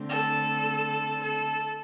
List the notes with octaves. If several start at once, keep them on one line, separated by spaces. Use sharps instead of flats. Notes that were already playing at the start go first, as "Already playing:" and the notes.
Already playing: D3 A3 C4
A4
A4